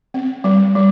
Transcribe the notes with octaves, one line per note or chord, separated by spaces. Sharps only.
C4
G3
G3